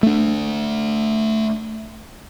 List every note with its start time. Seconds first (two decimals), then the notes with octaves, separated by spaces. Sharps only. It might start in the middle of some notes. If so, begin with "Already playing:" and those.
0.03 A3 D4